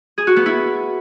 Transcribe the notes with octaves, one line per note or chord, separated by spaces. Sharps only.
G#4
F#4
B3
E4